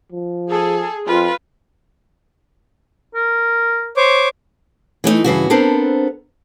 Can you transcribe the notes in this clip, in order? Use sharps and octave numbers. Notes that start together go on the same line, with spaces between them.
F3
G#4 A4
F2 F4 B4
A#4
C5 C#5 D6
E3 A3 B3 D#4
G2 C#3 E3 F#4
B3 C4 D4 A4 A#4 C5